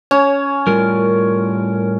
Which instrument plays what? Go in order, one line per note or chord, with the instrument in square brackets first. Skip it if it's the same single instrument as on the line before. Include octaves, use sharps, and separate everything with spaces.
[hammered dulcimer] C#4 [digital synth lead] C#5
[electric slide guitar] A2 G3 F4 [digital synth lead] A#4